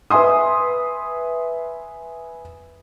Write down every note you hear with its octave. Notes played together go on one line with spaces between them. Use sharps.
B4 E5 G#5 C6 D#6